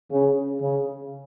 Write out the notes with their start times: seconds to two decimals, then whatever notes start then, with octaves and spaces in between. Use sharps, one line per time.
0.11 C#3
0.61 C#3